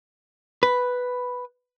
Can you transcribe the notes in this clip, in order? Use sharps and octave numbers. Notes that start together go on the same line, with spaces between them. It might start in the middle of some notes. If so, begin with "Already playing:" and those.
B4